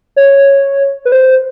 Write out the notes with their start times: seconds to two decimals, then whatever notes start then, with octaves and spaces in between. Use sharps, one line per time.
0.16 C#5
1.05 B4
1.12 C5